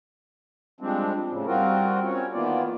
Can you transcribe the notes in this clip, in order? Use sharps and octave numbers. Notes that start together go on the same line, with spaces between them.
F3 G3 G#3 C4 D4
A2 C#3
G3 C4 F4 F#4 A#4
C4 C#4 C#5
D#3 E3 A#3 B3 F4 D5